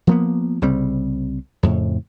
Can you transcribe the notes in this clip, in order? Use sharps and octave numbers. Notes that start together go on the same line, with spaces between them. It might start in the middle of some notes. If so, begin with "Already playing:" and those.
F3 A#3 B3
C2 C#3 G3 C4
F2 A2 C#3